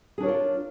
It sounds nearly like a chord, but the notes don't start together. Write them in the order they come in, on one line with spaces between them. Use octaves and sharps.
G#4 D4 C#5 A#4 F4